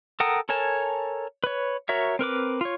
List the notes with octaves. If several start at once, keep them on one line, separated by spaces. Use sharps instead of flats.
A4 A#4 F#5 G5 D#6
A4 A#4 C#5 G#5 A5
B4 C#5
F#4 A#4 C#5 E5
C4 A#4 B4 D6
F4 C#5